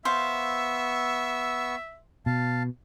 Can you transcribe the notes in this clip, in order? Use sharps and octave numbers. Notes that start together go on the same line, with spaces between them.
B3 C5 E5 F5 C#6 E6
B2 F5 A5